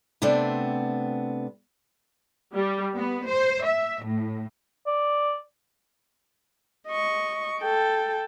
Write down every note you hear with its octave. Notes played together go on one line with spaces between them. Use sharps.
C3 A3 B3 C4 D4
G3
B3
C5
E5
A2
D5
D#5 C#6
A4 G5